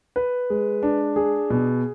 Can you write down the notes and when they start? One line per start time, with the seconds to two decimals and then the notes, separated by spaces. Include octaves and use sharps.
0.16 B4
0.50 G#3
0.83 D4
1.16 G#4
1.50 B2